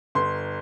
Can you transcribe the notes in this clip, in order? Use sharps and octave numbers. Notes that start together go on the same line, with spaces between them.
G1 C6